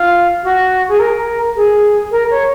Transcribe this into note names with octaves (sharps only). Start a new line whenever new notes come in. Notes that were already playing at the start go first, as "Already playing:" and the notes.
Already playing: F4
F#4
G#4
A#4
G#4
A#4
C#5